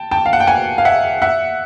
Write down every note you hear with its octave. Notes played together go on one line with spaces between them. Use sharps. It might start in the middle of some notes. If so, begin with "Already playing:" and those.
Already playing: G5 A5
G5 A5
F5
F#5
G5
F#5 G#5
F5
E5 F#5
E5 F#5